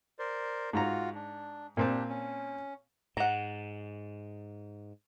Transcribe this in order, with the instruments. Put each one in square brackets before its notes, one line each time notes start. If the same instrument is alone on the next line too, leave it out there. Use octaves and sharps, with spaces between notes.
[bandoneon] A#4 C5 D5
[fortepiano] G#2 A#5 [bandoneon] F4 F#4
[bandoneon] D4
[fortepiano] A#2 C4 A5 [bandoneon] D4 G4
[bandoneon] C#4
[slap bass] G#2 [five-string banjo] F#5 A#5